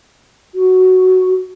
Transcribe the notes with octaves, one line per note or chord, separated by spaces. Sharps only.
F#4